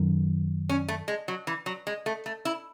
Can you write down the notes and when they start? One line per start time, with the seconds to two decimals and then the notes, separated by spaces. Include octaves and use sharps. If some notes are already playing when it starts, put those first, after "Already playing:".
Already playing: F#2 D#3 F#3
0.69 C#4
0.88 A3
1.08 G#3
1.28 F#3
1.47 E3
1.66 F#3
1.87 G#3
2.06 A3
2.26 A3
2.45 E4